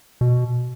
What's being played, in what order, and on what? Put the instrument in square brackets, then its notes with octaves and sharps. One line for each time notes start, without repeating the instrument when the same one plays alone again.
[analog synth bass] B2